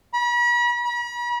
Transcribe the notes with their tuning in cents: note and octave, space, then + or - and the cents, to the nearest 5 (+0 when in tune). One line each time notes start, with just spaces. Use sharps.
B5 -40
B5 -45